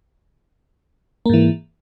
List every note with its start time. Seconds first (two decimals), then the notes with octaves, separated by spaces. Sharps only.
1.26 A#3
1.30 G#2
1.34 E3